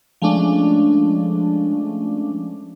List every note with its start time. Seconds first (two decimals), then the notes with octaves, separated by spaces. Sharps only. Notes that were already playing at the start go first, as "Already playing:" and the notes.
0.22 F3 G#3 A3 C#4 D4